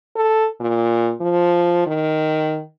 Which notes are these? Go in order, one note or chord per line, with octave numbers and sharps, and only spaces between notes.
A4
A#2
F3
D#3